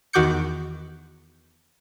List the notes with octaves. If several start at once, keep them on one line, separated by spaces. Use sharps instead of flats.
E2 D#3 F#4 D6 G6 C#7